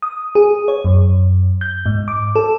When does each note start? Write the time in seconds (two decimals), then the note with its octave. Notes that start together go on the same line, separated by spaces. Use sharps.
0.02 D#6
0.35 G#4
0.68 C#5
0.85 F#2
1.61 G6
1.86 G#2
2.08 D6
2.36 A4